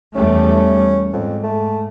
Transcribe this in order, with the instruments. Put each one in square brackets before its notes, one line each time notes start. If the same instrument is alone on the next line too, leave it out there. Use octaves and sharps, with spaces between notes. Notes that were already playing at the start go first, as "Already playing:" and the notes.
[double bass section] E2 G3 A3 [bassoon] C#4
[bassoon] F2 [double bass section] G#2
[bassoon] A3